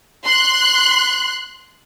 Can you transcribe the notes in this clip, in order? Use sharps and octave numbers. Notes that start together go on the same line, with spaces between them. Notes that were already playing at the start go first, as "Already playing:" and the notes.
C6 F#6